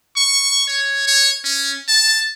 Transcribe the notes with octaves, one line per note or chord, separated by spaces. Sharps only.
C#6
C#5
C#5
C#4
A5